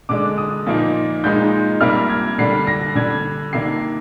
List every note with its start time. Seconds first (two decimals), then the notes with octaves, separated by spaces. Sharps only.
0.09 D3 G#3 D4 D6
0.38 D#6
0.67 A#2 F3 A#3 D#4
1.24 A#2 G#3 D#4 G6
1.81 C3 G3 A#3 D4 F6
2.09 G#6
2.38 D3 G3 D4 C7
2.67 A#6
2.95 D3 G3 D4 G#6
3.53 C3 D#3 A#3 D4 C7